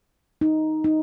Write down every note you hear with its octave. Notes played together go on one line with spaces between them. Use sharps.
D#4
D#4